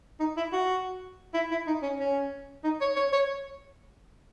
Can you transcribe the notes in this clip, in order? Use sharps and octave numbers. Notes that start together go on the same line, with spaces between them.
D#4
E4
F#4
E4
E4
D#4
C#4
C#4
D#4
C#5
C#5
C#5